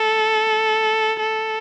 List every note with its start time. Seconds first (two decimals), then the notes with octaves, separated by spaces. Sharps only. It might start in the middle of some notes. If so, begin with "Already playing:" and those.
Already playing: A4
1.20 A4